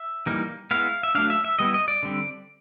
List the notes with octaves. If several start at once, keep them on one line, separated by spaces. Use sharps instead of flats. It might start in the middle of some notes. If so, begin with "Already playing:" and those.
Already playing: E5
E3 G3 A#3 D#4
G#3 B3 E4 F5
E5
F#3 A3 D4 F5
E5
E5
G3 B3 E4 D#5
D#5
D5
D3 G3 C4